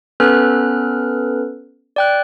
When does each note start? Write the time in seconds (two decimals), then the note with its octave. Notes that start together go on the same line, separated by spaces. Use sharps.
0.20 B3 C#4 A4 B4 F6 F#6
1.96 D5 G5 F#6